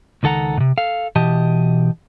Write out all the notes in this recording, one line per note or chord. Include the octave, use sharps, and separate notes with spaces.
C#2 D#3 A4 F#5 A#5
G#2 C3
A4 F5
B2 E3 G4 D#5 A5